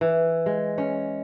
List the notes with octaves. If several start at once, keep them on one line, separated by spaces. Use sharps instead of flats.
E3
G#3
C#4